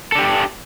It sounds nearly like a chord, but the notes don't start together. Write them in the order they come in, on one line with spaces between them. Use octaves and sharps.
A4 D4 G4